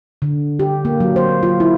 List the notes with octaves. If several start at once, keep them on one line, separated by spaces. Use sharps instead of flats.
D3
G4
A#3
F#3
C5
F4
E4